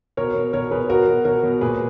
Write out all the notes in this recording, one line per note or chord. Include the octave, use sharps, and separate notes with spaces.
B2 A#4 C#5
B2
B2 A#4 C#5
B2 G#4 B4
B2 F#4 A#4
B2
B2 A#4 C#5
B2
A#2 G#4 B4